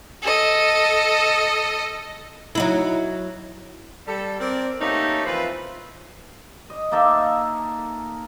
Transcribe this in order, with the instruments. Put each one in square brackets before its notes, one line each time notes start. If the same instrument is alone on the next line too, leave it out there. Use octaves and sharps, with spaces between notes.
[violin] A4 D#5
[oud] F#3 D#4 E4
[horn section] G3 A4
C4 A#4 D5
A3 A#3 C#4 D#4 G4 A4
E3 F3 C4 F4 B4
[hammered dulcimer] D#5
A#3 D#4 A4 E5